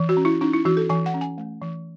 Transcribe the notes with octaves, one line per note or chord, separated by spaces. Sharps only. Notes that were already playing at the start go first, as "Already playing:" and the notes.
Already playing: E3
F#4
C#4
E4
C#4 D#4
E4
E3 F#4
A4
E3 G#5
F#5
C#4
G#5
A3
E3